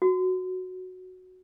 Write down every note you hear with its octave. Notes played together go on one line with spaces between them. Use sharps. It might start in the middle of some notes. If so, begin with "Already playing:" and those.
F#4